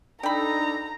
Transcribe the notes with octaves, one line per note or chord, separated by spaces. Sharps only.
D4 D#4 A4 G5 A#5 B5